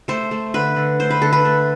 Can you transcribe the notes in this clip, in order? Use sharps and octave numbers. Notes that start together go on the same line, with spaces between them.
A3 C5
A3
D3 B4
D3
A3 C5
B4
D3 A4
B4
A3